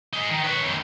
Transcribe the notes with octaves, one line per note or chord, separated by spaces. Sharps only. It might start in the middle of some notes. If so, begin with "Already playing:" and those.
D#4 G#4
D#3
B4 C#5
F#2 D#3